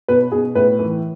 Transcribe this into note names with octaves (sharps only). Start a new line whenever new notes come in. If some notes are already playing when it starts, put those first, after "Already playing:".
B2 B4
B2 G#4
A2 B4
E3